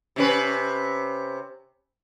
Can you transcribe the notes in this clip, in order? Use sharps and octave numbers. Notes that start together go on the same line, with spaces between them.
C3 C#4 B4